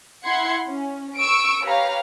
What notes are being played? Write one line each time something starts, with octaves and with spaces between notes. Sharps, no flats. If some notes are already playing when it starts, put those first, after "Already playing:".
E4 F#5 C6 G#6 C#7
C#4
C#6 E6 D7
G4 B4 C#5 F5 A#5